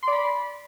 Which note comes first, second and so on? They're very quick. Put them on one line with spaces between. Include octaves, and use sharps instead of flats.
C6 D5 B5